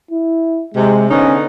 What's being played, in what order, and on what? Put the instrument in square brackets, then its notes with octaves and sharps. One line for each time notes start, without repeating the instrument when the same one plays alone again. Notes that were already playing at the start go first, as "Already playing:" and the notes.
[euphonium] E4
[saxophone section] C3 [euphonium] G#3
[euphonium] D3 [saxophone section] B3 D#4 [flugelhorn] C#4